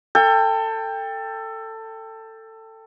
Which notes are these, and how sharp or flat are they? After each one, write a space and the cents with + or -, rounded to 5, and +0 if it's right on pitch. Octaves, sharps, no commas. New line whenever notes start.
A4 +20 G5 +20